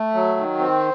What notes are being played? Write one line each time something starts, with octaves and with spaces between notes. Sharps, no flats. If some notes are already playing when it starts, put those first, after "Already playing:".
Already playing: A3
F#3
D#3
C4